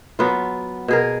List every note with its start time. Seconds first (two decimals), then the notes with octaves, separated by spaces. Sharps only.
0.19 F#3 B3 F4
0.88 B2 G#4 A#4